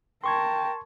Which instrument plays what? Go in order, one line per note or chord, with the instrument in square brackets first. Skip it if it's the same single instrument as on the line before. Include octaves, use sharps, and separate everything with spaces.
[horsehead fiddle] A#4 A5 [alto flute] G5 [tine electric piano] C6 C#6 G#6